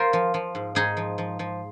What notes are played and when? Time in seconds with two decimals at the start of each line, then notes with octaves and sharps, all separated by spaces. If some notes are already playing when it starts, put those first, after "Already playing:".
Already playing: F4 A#4 C5
0.13 F3
0.34 F3
0.55 G#2
0.75 G#2 D#4 G#4
0.97 F3
1.18 F3
1.39 F3